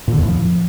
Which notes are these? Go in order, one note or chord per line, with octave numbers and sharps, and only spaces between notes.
A#2
D3
E2
A2
F3